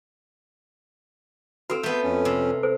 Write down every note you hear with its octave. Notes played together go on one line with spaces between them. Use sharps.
C4 F#4 A4 F5
A3 B3 G6
F2 C#4
C3
A4 C5